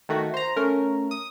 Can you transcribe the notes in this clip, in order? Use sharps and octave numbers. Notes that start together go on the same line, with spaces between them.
D#3 A3 F#4
C5 A#5
A3 C#4 A#4
D#6